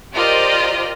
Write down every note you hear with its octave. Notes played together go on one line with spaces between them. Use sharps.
F4 G4 A#4 C5 D5 D#5